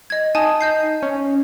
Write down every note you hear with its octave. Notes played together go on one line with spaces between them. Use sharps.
D#5 G#6
D#4 G#5 A5 D#6
D#5 G6 C7
C#4